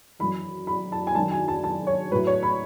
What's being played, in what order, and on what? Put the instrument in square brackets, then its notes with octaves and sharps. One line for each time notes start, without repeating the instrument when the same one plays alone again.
[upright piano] F#2 E3 B5
B5
A5
G#5
F#2 D#3 F#3 A5
G#5
A5
A5
C#5
A2 F#3 B4
C#5
B5